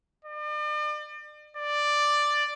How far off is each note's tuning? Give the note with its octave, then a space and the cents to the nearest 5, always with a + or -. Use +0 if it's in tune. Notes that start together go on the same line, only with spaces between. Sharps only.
D5 +40
D5 +5